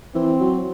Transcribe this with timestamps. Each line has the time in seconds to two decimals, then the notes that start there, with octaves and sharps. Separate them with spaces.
0.14 E3 C4
0.40 F#3